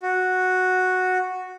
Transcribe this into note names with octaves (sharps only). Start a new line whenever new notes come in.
F#4